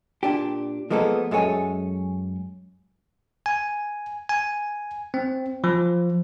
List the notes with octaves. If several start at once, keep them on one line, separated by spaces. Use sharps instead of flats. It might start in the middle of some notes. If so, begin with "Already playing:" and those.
A#2 D4 G4
F3 G#3 A#3 B3 A4
F#2 G#3 A4 C#5 G#5
G#5
G#5
C4
F3